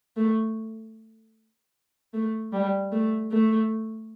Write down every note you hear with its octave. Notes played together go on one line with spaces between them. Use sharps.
A3
A3
G3
A3
A3